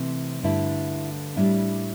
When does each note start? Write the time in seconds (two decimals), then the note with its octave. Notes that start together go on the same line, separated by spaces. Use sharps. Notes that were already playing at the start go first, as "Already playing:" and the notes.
Already playing: C3 E3 A3 C4
0.43 G2 D3 A3 D4 E4
1.36 A2 G3 D4 E4